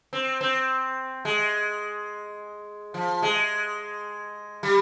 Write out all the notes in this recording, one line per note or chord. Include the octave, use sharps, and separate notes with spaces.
C4
C4
G#3
F3
G#3
G3